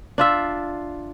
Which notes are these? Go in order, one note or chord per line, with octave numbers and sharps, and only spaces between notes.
D4 F4 E5